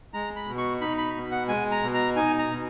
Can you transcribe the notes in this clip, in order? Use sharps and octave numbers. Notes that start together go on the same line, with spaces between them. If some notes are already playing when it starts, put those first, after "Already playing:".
G#3 A#5
B5
B2
C#6
D#4 B5
B5
B2
F#5
G#3 G#5
A#5
B2
A#5
D#4 G#5
A#5
B2